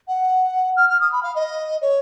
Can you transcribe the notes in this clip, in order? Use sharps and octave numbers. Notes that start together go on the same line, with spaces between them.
F#5
F6
F6
D#6
B5
F5
D#5
C#5